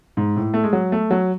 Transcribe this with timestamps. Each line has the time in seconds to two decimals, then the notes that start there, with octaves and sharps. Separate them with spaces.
0.17 G#2
0.36 A2
0.54 A3
0.64 G#3
0.73 F#3
0.92 A3
1.11 F#3